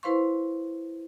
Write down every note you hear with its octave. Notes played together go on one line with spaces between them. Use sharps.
E4 B4 C5 F5 C6 C#6